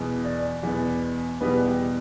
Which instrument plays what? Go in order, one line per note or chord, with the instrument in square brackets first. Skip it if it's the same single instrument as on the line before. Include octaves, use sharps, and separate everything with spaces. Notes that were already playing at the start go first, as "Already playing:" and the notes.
Already playing: [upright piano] E2 B2 B3
D5
E2 B2 B3
E2 B2 G3 B3 B4
G4